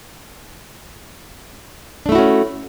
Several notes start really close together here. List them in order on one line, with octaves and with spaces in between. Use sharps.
D4 A3 E4 F#4 C#4